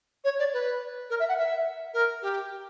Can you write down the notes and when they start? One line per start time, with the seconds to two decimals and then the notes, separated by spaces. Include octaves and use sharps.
0.24 C#5
0.39 D5
0.53 B4
1.10 A#4
1.19 E5
1.28 F#5
1.37 E5
1.93 A#4
2.22 G4